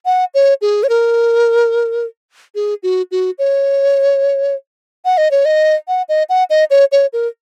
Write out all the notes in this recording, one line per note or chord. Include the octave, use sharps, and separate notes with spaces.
F#5
C#5
G#4
C#5
A#4
G#4
F#4
F#4
C#5
F#5
D#5
C#5
D#5
F#5
D#5
F#5
D#5
C#5
C#5
A#4